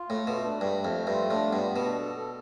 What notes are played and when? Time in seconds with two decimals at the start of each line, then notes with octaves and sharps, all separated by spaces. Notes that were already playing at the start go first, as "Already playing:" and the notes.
Already playing: F4
0.09 A2 A3
0.27 B2 A3
0.44 D4
0.61 G2 A3
0.78 A3
0.85 F2
0.96 A3
1.07 G2
1.13 F4
1.30 A2 D4
1.47 B3
1.53 G2
1.64 B3
1.76 B2
1.82 D4
1.99 A4
2.16 A4